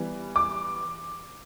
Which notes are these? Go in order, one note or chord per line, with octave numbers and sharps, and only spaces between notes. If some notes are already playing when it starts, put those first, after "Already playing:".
Already playing: E3 G3 B3
D6